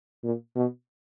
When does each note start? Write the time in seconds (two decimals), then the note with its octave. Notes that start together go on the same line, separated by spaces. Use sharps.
0.24 A#2
0.55 B2